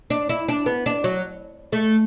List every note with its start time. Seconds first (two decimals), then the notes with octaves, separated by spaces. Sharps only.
0.10 D4
0.29 E4
0.48 D4
0.66 B3
0.86 D4
1.04 F#3
1.72 A3